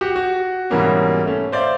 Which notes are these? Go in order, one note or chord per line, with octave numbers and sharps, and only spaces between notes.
F#4 G4 F#5
F#4
G#2 B2 E3 G3 A#3 C#4
A3 C#4
C5 D5 E5 F5